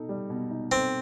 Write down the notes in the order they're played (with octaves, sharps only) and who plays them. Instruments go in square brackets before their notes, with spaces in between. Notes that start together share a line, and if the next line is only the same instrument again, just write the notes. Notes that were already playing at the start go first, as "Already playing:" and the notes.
Already playing: [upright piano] B2 D#4 A4
G3
B2
D#4
[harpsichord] C4 [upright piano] A4